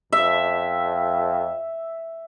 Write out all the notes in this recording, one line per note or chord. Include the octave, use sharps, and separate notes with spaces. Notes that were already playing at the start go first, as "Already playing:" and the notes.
F2 E5